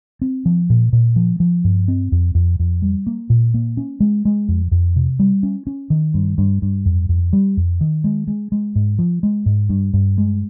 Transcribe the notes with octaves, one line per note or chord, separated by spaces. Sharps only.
C4
F3
A#2
A#2
F3
F3
G2
C4
F2
F2
F2
G3
A#3
A#2
A#3
C#4
G#3
G#3
F2
F2
C3
G3
C#4
C#4
D#3
G2
G2
G2
F2
F2
G3
F2
D#3
G#3
G#3
G#3
G#2
F3
G#3
G#2
G2
G2
G#3